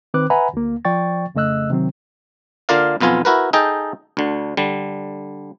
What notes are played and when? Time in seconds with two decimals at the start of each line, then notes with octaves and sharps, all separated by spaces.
0.14 D#3 C4 B4 D6 F#6
0.30 B4 E5 F#5 G#5 A#5 B5
0.53 D2 A#3
0.85 F3 D5 G5 C#6 A6
1.35 F2 C#3 A3 D#5 E6 F#6
1.70 C3 D#3 F#3 C4
2.69 D3 A#3 F4 A#4 D5 F5
3.00 B1 F2 B3 F4 G#5
3.25 E4 F#4 A#4 B4
3.53 D#4 G#4 A4 D#5 G5
4.17 D2 D3
4.57 D3 G3